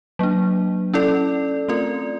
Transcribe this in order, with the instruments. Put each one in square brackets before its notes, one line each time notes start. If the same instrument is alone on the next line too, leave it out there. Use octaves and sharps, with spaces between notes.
[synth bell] F#3 A#3 D4
C#4 E4 A4 D5
A3 C4 F4 A#4 D5